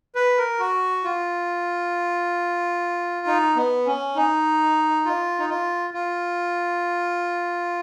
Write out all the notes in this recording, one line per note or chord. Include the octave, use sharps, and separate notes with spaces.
B4
A#4
F#4
F4
D#4
B3
C#4
D#4
F4
D#4
F4
F4